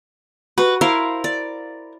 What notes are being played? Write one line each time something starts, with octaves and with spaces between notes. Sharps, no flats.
F#4 B4
E4 A#4 C5 F5
D5